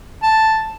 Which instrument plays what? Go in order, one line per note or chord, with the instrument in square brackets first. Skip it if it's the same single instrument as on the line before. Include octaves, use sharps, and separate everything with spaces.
[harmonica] A5